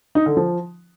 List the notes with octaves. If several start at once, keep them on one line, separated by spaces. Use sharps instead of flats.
D#4
D3
F3